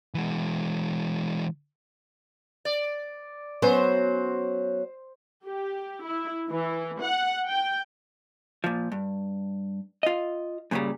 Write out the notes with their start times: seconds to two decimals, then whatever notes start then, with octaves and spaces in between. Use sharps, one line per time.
0.14 E3 G#3
2.65 D5
3.62 F#3 B3 C#4 C5
5.45 G4
6.03 E4
6.50 E3
7.01 F#5
7.48 G5
8.64 A#2 F3
8.92 G2
10.03 F4 D#5
10.71 F#2 A#2 C#3 F#3 G3